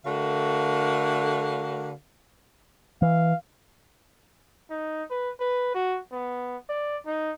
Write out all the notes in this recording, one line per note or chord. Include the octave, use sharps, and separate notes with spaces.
D3 A3 F#4 A#4 F5
E3 F5
D#4
B4
B4
F#4
B3
D5
D#4